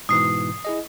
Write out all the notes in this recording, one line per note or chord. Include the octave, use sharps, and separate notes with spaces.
G#2 B2 E3 D#6 C7
E4 G#4 D#5